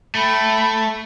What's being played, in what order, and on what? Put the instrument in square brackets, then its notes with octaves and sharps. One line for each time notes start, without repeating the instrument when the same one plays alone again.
[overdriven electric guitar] A3 [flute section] G5 B5